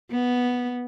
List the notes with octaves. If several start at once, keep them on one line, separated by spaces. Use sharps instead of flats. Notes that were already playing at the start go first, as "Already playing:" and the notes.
B3